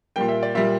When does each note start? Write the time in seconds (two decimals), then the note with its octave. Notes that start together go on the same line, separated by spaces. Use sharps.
0.16 A#2 G3 A#3 G5
0.29 E5
0.43 D5
0.55 A#2 G3 A#3 E5